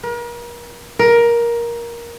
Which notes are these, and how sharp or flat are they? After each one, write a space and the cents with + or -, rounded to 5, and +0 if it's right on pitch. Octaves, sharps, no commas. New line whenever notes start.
A#4 +40
A#4 +15